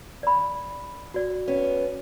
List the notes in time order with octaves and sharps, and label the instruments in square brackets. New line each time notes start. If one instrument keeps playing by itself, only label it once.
[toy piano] D5 B5
F#4 D5
[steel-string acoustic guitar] B3 C#4